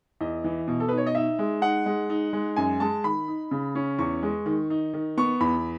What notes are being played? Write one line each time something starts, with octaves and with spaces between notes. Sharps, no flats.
E2 D#5
E3
B2
A4
D#4 B4
C#5
D#5
D#4 E5
G#3
D#4 F#5
G#3
D#4
G#3
F#2 G#5
G#3 A5
D#3 B5
D#4
C#3
C#4
E2 C#6
G#3
D#3
D#4
D#3
B3 C#6
E2 B5